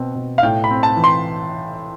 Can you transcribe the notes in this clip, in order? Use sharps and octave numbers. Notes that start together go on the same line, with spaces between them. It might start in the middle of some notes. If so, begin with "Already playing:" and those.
Already playing: B2 C4
B2
F5
A2 G5
B5
C4
A5
E3
C6